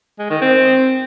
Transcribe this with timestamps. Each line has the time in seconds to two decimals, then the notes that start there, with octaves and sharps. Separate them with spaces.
0.19 G#3
0.30 D#3
0.41 C4